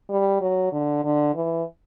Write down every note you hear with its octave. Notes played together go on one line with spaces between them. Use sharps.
G3
F#3
D3
D3
E3